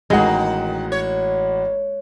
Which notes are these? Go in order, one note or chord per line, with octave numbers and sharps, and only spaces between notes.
A1 D#3 G#3 A#3 F#4 F#5
C#5